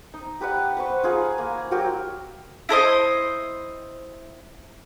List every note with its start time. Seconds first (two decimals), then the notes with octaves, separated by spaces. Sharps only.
0.14 D#4
0.41 G4 B4 D5 F#5
0.77 B4 C5 C#6
1.03 D#4 F4 G#4
1.38 A#3
1.71 F#3 F#4 G4 A#4
2.69 E4 A4 C5 D#5